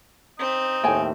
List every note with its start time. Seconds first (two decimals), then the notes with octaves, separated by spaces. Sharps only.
0.39 C4 D#4
0.84 D#2 A2 G5 G#5